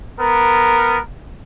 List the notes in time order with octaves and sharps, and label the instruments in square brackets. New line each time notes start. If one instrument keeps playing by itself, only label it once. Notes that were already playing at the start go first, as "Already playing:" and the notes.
[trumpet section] B3 A#4